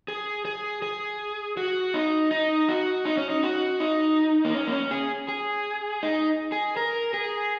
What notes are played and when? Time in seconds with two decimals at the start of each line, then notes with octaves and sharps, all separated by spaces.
0.08 G#4
0.45 G#4
0.82 G#4
1.57 F#4
1.94 D#4
2.31 D#4
2.68 F#4
3.05 D#4
3.17 C#4
3.30 D#4
3.43 F#4
3.80 D#4
4.45 A#3
4.54 C#4
4.67 A#3
4.73 C#4
4.91 G#4
5.28 G#4
6.03 D#4
6.52 G#4
6.77 A#4
7.14 G#4